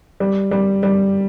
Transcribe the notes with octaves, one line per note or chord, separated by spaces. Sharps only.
G3
G3
G3